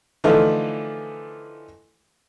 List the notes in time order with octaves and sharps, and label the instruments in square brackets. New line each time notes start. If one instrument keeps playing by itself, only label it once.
[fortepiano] D3 E3 F3 A3 D#4 F4